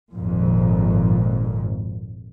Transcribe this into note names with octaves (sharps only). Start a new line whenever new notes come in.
G#1 F2 A#2